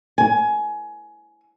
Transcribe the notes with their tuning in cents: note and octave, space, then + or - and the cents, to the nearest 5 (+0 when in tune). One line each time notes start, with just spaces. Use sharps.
G#5 +20